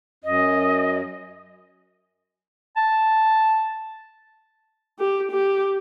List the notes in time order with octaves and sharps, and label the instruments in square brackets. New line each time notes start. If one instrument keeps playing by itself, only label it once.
[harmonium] F#2 [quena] D#5
[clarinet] A5
[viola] G4
G4